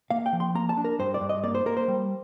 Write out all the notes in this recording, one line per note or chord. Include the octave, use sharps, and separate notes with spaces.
A#3 F5
G5
F3
C6
A#3 A#5
A5
D4
A#4
G2 C5
D5
G2
D#5
A#3 D5
C5
A#3 A#4
C5
G3